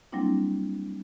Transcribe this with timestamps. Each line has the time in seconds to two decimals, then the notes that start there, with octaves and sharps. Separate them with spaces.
0.12 F#3 G3 A#3 C4 D4 E4